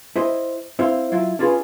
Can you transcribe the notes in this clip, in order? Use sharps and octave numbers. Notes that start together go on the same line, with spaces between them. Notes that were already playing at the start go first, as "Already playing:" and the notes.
E4 C5 D#5
C4 E4 C5 F5
F#3 E4 F4
C#4 D4 F4 G#4 B4